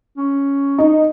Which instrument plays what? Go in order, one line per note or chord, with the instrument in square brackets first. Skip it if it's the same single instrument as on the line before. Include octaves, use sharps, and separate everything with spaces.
[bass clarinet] C#4
[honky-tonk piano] D#4